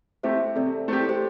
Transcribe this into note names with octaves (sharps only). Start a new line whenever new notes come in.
A3 C4 G4 C5 E5
C3 A4 D5
A3 C4 G4 C5
A4
G4 C5